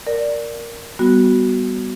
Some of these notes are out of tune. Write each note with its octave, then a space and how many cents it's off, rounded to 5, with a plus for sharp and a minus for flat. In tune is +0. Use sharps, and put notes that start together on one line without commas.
A#4 +0 D5 +0
G3 +0 B3 +0 F#4 +5